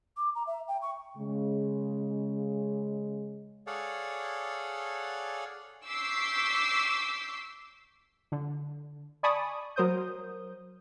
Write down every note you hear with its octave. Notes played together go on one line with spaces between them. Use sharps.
D6
A#5
E5
G5
C#6
C#3 G#3
G#4 A4 C#5 D5 F5 F#5
C#6 D6 E6 G6 B6 C7
D3
D5 G#5 A5 B5 C#6 D#6
F#3 A#4 C5 D#6 G6